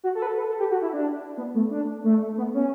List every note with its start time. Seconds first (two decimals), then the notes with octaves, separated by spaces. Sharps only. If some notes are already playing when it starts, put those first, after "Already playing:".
0.04 F#4
0.15 A4
0.22 B4
0.27 A4
0.37 B4
0.48 A4
0.59 G4
0.71 F#4
0.82 E4
0.93 D4
1.37 B3
1.54 A3
1.71 D4
2.04 A3
2.38 B3
2.54 C#4